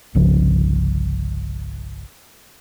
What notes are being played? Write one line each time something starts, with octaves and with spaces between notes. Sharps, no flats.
G1 C2 C#3 F3